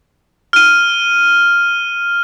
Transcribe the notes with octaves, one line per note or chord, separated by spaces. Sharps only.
F6 D#7